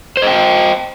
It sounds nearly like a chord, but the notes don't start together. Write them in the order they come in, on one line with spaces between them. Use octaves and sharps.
C5 D#5 G5